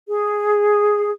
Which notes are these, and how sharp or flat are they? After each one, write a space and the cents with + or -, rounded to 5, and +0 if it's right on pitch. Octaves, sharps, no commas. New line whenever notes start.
G#4 +0